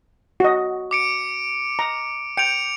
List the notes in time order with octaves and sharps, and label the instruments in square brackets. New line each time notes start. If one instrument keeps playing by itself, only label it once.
[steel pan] F#4 D#5
[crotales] D6 C#7 D7
[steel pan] A#5
[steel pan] G5 [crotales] C#7 D7 F7